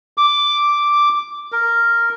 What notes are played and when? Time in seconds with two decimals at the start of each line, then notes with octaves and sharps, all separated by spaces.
0.18 D6
1.52 A#4